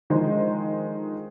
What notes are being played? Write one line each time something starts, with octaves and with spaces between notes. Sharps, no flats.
D3 D#3 F3 G#3 D#4 C5